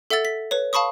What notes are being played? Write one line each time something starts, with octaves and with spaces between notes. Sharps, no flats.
A4 E5 F#5 E6 A6
B6
B4 C#5
F5 A5 B5 C#6 D#6